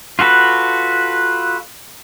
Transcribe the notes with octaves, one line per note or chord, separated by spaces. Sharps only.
F4 F#4 A4 B4